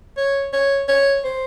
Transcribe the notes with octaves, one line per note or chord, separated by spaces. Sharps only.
C#5
C#5
C#5
C5